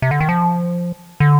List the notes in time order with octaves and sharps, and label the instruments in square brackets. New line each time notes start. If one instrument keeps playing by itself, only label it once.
[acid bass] C3
D3
D#3
F3
D3